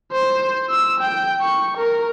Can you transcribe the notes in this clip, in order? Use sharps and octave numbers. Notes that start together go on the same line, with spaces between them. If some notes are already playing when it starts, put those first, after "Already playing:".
C5
E6
G5
C#6
A#4